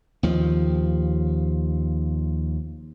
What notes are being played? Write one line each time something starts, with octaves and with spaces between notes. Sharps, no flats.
D#2 F3